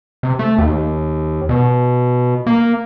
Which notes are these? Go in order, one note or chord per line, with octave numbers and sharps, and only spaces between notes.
C3
A3
D#2
B2
A#3